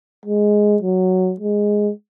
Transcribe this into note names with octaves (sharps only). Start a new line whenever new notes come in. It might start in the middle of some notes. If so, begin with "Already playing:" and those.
G#3
F#3
G#3